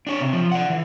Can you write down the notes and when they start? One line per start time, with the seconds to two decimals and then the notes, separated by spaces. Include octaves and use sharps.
0.07 D4 C#5
0.21 C3
0.33 F3
0.52 D5 F#5
0.70 E3